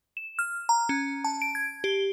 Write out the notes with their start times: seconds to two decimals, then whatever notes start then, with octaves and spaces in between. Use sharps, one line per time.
0.17 E7
0.39 F6
0.69 A#5
0.89 C#4
1.24 A5
1.42 D7
1.55 G#6
1.84 G4